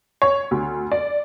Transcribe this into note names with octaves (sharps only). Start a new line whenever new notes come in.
C#5
D2
D5